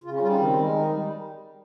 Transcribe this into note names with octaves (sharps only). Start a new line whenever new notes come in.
C#3 F4
C#4
G3 F4
D#4
D#3 C4
G#3
D#3 D#4
G3